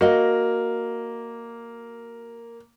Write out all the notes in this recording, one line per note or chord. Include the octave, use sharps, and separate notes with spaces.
A#3 F#4 D#5 F5